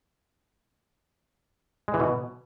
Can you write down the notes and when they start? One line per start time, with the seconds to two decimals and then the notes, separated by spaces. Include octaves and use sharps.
1.88 G#3
1.94 E3
2.00 B2